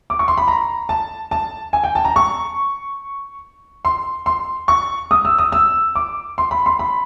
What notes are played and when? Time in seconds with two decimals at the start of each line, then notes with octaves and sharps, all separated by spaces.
0.10 D6
0.19 C#6
0.28 C6
0.37 B5
0.48 A#5
0.89 A5
1.31 A5
1.73 G#5
1.84 G5
1.95 A5
2.05 A#5
2.16 C#6
3.85 C6
4.26 C6
4.68 C#6
5.11 D#6
5.25 E6
5.39 D#6
5.52 E6
5.95 D6
6.38 C6
6.51 B5
6.66 C6
6.79 B5